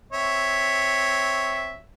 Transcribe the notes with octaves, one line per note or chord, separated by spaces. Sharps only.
C4 C#5 E5